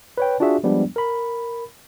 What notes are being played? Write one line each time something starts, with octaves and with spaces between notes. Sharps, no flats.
B4 C#5 G5
D4 F4 F#4 G#4 E5
F3 G3 G#3 B3 D4
A#4 B5